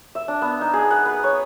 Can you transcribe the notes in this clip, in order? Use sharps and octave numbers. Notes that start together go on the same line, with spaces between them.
E5
D4
B3
D#4
G#4
F#5
B4
C#5